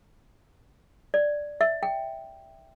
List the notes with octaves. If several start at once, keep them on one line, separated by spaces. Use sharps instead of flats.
D5
E5
G5